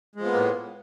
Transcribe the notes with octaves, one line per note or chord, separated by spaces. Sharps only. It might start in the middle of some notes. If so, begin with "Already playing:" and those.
A2 F3 G#3 A#3 B3